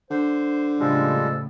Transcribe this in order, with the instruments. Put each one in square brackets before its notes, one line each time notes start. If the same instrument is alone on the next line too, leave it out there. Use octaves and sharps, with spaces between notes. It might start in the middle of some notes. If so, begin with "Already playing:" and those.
[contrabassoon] D3 [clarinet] C5
[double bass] A2 C#3 [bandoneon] F3 G3 G#3 [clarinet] A4